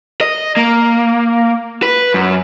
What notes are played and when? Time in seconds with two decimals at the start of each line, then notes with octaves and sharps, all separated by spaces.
0.21 D#5
0.57 A#3
1.83 B4
2.14 F#2